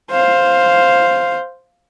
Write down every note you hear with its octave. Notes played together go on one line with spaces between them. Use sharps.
C5 F5